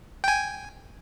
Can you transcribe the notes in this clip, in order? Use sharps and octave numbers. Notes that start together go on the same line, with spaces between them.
G5 G#5